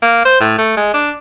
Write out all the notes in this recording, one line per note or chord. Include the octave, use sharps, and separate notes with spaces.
A#3
C5
A2
A3
G#3
D4